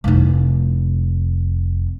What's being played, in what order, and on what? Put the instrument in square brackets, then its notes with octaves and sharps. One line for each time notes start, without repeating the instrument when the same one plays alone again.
[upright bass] F1 E4